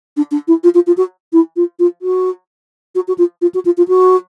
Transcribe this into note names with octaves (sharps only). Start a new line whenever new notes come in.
D4
D4
E4
F4
F4
F4
F#4
E4
F4
F4
F#4
F#4
F#4
F4
F4
F#4
F4
F4
F#4